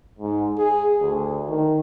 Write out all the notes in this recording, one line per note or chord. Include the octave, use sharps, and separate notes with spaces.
G#2
G#4
D2
D#3